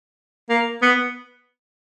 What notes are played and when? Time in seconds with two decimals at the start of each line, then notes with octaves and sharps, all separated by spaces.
0.50 A#3
0.82 B3